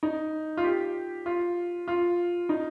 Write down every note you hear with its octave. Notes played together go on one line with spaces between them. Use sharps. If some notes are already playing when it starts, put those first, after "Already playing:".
D#4
F4
G4
F4
F4
D#4